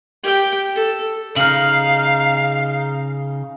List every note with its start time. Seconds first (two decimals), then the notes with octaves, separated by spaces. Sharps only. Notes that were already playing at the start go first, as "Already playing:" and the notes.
0.23 G4 G5
0.75 A4
1.36 C#3 D#4 F5 F6 F#7